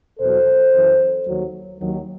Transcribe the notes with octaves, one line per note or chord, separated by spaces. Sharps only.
E2 B2 F#3 A4 C5
F#2 E3
D#2 D#3 F#3
D#2 D#3 F#3